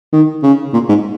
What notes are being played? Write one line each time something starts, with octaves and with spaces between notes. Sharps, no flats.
D#3
C#3
A#2
G#2